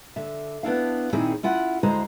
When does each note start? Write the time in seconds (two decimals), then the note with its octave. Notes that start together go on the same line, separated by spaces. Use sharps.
0.16 D3 E5
0.63 B3 D4 E4 F5
1.13 A#2 D#3 C4 E4 G#4 C#5
1.43 C#4 E4 F4 F#5
1.83 D2 D3 G#3 E4 C5 A#5